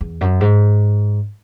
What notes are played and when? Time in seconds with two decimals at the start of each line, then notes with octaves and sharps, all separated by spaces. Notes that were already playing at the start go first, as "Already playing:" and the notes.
0.01 E2
0.21 F#2
0.41 G#2